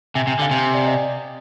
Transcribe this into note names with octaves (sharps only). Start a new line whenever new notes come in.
C3 G#5
C3
G#5
D3
F5
C3 G#5
G#5
D5
D#5